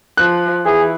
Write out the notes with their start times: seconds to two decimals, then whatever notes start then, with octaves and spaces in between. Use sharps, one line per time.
0.17 F3 F#6
0.65 E3 G#4